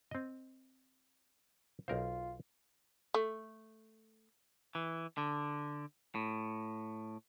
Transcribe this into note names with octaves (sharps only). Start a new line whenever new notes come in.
C4 D#5
B1 F4 A#4 C5
A3
E3
D3
A2